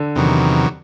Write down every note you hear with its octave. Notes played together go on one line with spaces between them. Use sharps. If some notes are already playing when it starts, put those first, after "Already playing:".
Already playing: D3
E2 C3 D#3 F#3